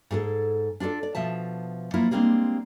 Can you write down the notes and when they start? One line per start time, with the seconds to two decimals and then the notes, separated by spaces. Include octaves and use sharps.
0.11 G#2 G#4 A4
0.80 D4 F4 G#4 A4 D5
1.03 D5
1.15 B2 F3 E5 A5
1.94 F3 F#3 A#3 E4 F4
2.11 G3 G#3 A#3 C4 D4